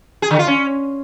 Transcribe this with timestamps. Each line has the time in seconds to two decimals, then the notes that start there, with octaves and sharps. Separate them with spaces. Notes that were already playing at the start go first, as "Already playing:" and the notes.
0.22 G#4
0.31 D3
0.39 F4
0.47 C#4